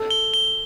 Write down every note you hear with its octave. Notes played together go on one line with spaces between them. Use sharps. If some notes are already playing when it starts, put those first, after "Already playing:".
Already playing: A4
G7
G7